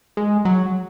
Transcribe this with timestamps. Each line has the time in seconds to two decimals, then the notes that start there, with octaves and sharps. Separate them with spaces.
0.17 G#3
0.45 F#3